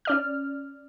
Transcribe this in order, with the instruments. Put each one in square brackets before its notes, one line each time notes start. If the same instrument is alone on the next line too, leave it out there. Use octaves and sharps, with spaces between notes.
[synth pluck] C#4 D5 F6